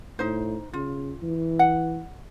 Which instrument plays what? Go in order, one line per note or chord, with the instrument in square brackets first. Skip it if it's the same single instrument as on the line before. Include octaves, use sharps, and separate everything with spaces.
[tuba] A2 [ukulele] D#4 C5
[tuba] C#3 [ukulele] F4
[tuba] E3
[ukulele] F#5